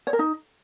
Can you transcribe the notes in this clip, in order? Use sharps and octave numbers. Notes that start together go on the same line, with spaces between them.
C#5
A#4
D#4